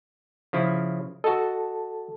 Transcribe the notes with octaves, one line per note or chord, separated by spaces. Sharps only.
C#3 F3 E4
F#4 A4 D#5 A5